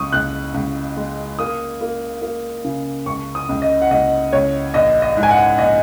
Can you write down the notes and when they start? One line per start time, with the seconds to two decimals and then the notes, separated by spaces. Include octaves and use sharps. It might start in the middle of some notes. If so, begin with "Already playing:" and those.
Already playing: C#2 C#6 D#6
0.13 C#2 F#6
0.54 C#2
0.97 G#3
1.39 A#3 D#6
1.81 A#3
2.22 A#3
2.64 C#3
3.06 C#2 C#6
3.35 D#6
3.49 C#2
3.62 D#5
3.82 F#5
3.91 C#2 D#5
4.33 C#2 C#5
4.74 A#1 D#5
5.02 D#5
5.17 G#2
5.23 G#5
5.31 F#5
5.58 A#1 D#5